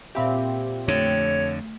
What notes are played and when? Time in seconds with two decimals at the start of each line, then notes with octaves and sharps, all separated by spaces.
0.15 A#2 C4 G4 E5 F5 B5
0.88 F2 D3 A3 C#5